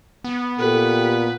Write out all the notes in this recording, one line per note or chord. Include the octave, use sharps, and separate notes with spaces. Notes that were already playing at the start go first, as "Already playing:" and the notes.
B3
A#2 G4 A4 B4